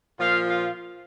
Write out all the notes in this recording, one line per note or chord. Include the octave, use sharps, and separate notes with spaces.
A#2 F3 F4 F5
F4 F5